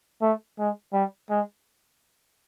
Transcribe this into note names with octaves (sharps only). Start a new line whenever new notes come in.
A3
G#3
G3
G#3